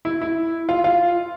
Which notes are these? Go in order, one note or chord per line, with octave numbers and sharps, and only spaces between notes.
E4
E4
F4
F4